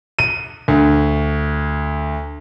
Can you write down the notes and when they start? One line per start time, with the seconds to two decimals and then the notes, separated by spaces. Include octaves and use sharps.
0.19 D#7
0.68 D2